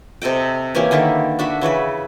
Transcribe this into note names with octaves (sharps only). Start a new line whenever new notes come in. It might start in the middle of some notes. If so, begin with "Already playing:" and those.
C3 A4 D#5 G5
E3 A#3 C#4 G4
D3 D#3 E4 G4
D4 F#4 E5 B5
C#3 E3 F#4 B4